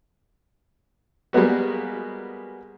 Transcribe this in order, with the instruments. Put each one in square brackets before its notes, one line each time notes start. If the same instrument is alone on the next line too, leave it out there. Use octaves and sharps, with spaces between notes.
[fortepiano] G3 G#3 A#3 B3 F#4